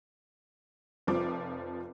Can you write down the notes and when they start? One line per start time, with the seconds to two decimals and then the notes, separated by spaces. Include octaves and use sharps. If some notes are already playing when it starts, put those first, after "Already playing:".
1.07 F1 F3 D6